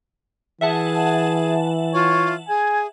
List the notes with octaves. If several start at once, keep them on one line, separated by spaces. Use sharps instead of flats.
E3 G#4 E5 F#5 A5
F4 C#5
G#4 G#5